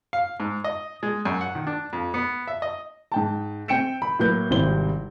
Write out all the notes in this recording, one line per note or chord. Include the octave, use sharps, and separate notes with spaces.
F5
G#2
D#5
G#3
F#2
F#5
D#3
D4
F2
B3
E5
D#5
G#2 G5 A5
C4 G5 G6 C#7 D7 E7
B5
A2 F#3 A#3 B4 G6
G#1 C3 G3 E4 C5 G7